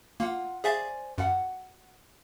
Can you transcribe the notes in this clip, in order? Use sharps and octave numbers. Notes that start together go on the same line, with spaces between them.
A#3 F4 F#5
G#4 C5 D5 E5 F5 G#5
F#2 F#4 F#5